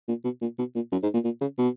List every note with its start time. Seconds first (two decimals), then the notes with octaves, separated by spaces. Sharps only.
0.08 A#2
0.24 B2
0.42 A#2
0.59 B2
0.75 A#2
0.92 F#2
1.03 G#2
1.14 A#2
1.24 A#2
1.41 C#3
1.59 B2